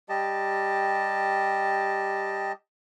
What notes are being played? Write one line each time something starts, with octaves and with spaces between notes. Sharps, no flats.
G3 G4 D#5 A5